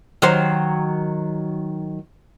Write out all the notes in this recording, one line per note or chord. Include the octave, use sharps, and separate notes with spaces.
D#3 F#3 C5